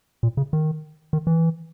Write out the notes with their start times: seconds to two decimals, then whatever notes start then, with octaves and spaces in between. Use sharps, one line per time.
0.23 A#2
0.37 C#3
0.53 D#3
1.13 D#3
1.27 E3